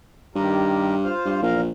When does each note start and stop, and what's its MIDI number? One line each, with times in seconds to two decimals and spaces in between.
0.35 1.12 43
0.35 0.95 51
0.35 0.95 67
0.35 0.95 70
1.04 1.41 65
1.04 1.41 72
1.04 1.41 77
1.25 1.38 43
1.42 1.71 34
1.42 1.61 40
1.42 1.61 70
1.42 1.61 77